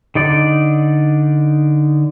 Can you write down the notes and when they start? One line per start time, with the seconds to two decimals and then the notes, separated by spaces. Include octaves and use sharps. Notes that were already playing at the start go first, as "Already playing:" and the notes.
0.15 D3 D#4 D5